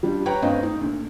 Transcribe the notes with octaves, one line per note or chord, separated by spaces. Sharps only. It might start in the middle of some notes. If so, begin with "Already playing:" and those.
G3 D4 F4
B4 C#5 G5 A#5
G1 D2 C4 D#5 F5
D#4
D2 A#2